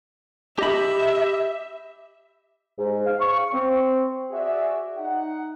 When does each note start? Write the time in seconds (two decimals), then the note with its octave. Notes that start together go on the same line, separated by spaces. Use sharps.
0.59 G4 D#5 E5 B5
2.78 G#2
3.06 F5
3.20 C#6
3.53 C4
4.31 F#4 G#4 D5 E5
4.97 D#4 F#5